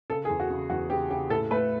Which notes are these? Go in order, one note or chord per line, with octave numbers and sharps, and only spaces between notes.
C#3 A4
G#4
E2
F#4
C#3
E2 F#4
C#3 G4
C#3 G4
A2 A4
A3 B4